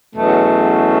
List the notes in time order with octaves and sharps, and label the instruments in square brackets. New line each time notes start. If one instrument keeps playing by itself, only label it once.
[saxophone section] E2 B2 F#3 A3 C#4